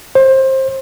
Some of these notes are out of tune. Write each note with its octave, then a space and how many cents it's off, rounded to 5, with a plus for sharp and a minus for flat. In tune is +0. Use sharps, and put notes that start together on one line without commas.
C5 +25